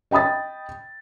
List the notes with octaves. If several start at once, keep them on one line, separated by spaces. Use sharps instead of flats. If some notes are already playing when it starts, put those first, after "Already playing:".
D#5 G5 B5 D#6 A6